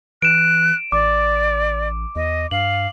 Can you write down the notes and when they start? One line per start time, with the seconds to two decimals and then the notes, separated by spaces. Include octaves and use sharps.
0.22 E3 F#6 D7 E7
0.92 A1 D5 D6
2.16 E2 D#5
2.51 G2 F5 F#7